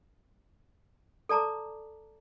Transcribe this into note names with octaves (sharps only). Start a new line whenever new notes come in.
A4 D5 A5 A#5 D6